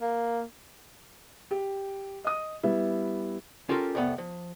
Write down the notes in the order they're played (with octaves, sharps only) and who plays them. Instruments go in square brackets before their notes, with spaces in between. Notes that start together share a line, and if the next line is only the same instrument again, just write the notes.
[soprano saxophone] A#3
[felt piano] G4
D#5 D#6
G3 B3 E4
[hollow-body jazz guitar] C#4 F4 G4 A4 A#4
C2 F2 A3 B3
F3